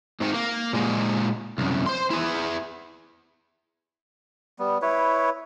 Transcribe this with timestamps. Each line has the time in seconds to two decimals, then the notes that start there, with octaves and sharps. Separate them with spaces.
0.20 G#2 D#3
0.34 A#3
0.73 A#2 G#3
1.58 C2 F#2
1.86 C5 C6
2.11 E4 G#4
4.59 G3 B3
4.82 E4 B4 C#5